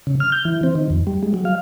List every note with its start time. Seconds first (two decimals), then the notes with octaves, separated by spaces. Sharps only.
0.07 C#3
0.20 F6
0.32 G6
0.45 E3
0.63 C4
0.75 D#3
0.90 F2
1.07 G3
1.23 G#3
1.34 F#3
1.45 F5